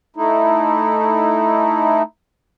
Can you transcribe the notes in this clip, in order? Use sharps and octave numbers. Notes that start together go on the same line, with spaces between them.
A3 D#4 E4